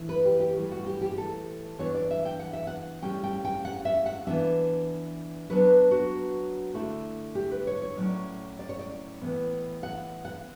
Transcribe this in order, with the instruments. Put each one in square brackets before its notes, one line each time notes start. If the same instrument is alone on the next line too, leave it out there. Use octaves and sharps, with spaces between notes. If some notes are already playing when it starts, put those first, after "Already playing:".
Already playing: [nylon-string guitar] E3 A3 D4
B4
G4
G4
A2 E3 G3
F#4
G4
G4
G4
A4
E3 B3 D4 C#5
D5
E5
G5
F#5
E5
F#5
A2 G3 C#4 G5
G5
G5
F#5
E5
F#5
E3 B3 D4 E5
F#3 B3 D4 B4
F#4
D3 A3 E4
G4
B4
C#5
C#5
A2 F#3 C#4 E4 D5
D5
C#5
D5
A2 E3 B3 E4
F#5
F#5